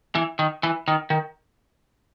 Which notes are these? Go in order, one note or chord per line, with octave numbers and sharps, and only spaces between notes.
E3
D#3
E3
D#3
D#3